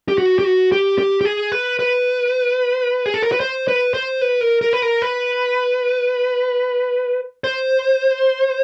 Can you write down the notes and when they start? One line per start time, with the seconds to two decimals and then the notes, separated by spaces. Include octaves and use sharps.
0.09 G4
0.18 F#4
0.39 G4
0.44 F#4
0.72 G4
0.98 G4
1.21 G4
1.25 G#4
1.52 B4
1.79 B4
3.06 G#4
3.14 A4
3.23 A#4
3.32 B4
3.40 C5
3.68 B4
3.94 C5
4.21 B4
4.41 A#4
4.61 A#4
4.73 B4
4.82 A#4
5.02 B4
7.44 C5